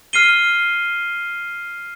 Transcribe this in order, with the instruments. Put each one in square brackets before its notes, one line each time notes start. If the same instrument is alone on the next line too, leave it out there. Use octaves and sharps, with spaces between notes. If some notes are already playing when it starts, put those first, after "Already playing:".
[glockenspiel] F6 C7 D#7 G7